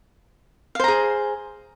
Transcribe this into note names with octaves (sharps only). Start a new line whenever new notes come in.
G#4 C5 F5 A#5